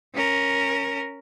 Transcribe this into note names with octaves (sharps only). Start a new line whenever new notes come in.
C#4 A#4